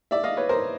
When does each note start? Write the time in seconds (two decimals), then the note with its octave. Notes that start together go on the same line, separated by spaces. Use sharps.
0.11 D5 E5
0.24 D#5 F5
0.37 B4 C#5
0.49 A#4 C5